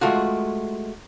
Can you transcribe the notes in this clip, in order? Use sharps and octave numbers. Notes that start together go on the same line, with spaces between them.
G#3 A3 F4 F#4